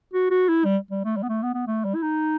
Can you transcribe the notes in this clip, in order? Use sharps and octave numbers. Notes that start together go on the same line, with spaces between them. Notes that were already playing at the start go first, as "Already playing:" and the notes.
F#4
F#4
E4
G3
G3
A3
G3
B3
A3
B3
B3
A3
G3
E4
D#4